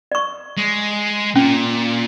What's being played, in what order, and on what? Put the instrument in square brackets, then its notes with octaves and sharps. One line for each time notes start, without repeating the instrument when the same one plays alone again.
[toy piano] D5 C#6
[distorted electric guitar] G#3
[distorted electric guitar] A#2 [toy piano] C#4